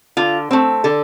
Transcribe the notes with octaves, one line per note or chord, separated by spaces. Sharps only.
D3 F4
A3 C4
D3 A4